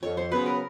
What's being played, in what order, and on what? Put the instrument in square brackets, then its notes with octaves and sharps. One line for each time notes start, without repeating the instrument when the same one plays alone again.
[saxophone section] F2 [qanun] C#5
[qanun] C5
[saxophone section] C#3 F#3 B3 [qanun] B4
[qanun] A#4